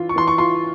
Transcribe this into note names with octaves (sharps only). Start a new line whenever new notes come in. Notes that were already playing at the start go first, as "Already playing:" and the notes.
Already playing: E3 F4
C#6
E3 C6
C#6
F4 C6